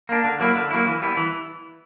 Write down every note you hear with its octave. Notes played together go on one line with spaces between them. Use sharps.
A#3 D4
D3
F#3 A#3 E4
D3
F#3 A#3 E4
E3
G3 B3 E4
E3